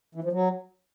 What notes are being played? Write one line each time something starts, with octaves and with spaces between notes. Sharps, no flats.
E3
F3
F#3